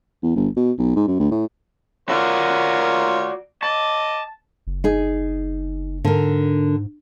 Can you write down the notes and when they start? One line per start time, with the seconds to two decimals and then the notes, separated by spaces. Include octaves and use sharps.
0.23 E2
0.36 G1
0.56 B2
0.78 B1
0.96 G#2
1.07 F#2
1.20 D2
1.31 A2
2.09 F4 F#4 A#4 C#5 D5
3.63 D#5 A5 D6
4.67 F#1
4.84 D#4 G#4
6.04 G#2 D3 A#4